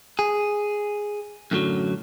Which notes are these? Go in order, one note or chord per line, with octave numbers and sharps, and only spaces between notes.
G#4
F#2 A2 D3 D#3 F#3